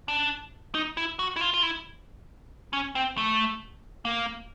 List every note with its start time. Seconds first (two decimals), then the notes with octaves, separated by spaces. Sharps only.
0.08 D4
0.75 D#4
0.97 E4
1.19 F#4
1.36 E4
1.41 F4
1.54 F4
1.63 E4
2.73 C#4
2.95 C4
3.17 A3
4.05 A#3